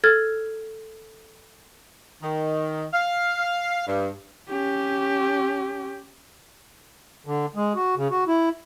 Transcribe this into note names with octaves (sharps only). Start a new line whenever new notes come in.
A4 F6 G#6 A6
D#3
F5
G2
C#4 G4
D3
G#3
F#4
C#3
F#4
E4